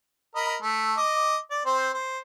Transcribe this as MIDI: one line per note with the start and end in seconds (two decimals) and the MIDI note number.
0.35 0.57 70
0.35 0.57 75
0.35 0.57 83
0.62 0.95 57
0.97 1.37 75
0.97 1.37 86
1.51 1.64 74
1.66 1.91 60
1.66 1.91 72
1.94 2.19 72